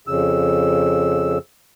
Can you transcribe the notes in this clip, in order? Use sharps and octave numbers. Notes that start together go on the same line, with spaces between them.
F2 C#3 E6